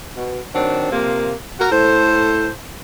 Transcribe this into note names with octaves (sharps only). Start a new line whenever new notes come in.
B2
D#3 F#3 C4 D4
C3 F3 A#3
F#4 A#4
A2 A4 C5